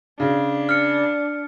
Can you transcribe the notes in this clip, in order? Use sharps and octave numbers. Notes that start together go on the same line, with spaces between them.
C#3 D4
F6 C#7